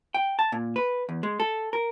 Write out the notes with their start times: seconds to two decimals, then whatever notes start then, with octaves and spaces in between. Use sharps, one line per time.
0.14 G5
0.39 A5
0.52 A#2
0.76 B4
1.09 E2
1.23 G#3
1.40 A4
1.73 A#4